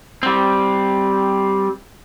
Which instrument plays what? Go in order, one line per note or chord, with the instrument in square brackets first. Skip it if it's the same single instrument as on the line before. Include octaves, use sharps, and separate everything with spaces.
[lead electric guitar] G3 C4